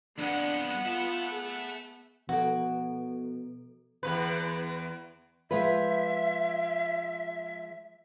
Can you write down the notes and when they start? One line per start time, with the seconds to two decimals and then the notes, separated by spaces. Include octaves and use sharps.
0.18 F2 G#3 B3 D4 F#5
0.85 F4 E5 A5
1.32 G#4
2.29 B2 F3 F#4 A4
4.03 E2 C3 B4
5.51 F3 G#3 B4 E5